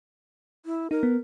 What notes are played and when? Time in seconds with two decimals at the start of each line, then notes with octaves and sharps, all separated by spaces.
0.66 E4
0.91 D#4 A#4
1.03 B3